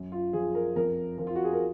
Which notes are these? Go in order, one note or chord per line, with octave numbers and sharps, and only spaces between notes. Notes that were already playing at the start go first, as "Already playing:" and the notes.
Already playing: F#2
F4
F3 G#4
A#4
F2 A#4
F3 A#4
F4
F#4
G#4
A#4